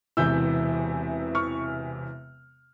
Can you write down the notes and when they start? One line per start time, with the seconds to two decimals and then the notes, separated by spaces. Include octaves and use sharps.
0.17 E1 E2 C3 E3 E6 G6
1.35 C#6 F6